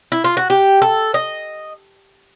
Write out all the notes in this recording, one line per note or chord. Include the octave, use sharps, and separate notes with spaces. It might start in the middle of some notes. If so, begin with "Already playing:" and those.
E4
F4
F#4
G4
A4
D#5